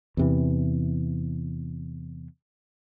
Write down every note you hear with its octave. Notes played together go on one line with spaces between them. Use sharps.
E2 C3 E3